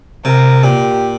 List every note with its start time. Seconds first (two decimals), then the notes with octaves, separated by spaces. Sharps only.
0.25 C3 A#4
0.63 A#2 G4